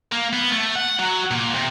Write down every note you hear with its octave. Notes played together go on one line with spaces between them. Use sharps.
A#3
B3
A3
F#5
F#3
A#2
C3